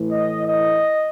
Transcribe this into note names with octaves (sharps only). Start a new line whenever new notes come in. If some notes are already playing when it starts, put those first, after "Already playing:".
Already playing: A2 E3
D#5
D#5